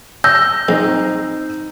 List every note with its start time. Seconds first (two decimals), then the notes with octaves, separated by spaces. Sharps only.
0.24 E6 G6 A#6
0.69 A#1 C4 D#4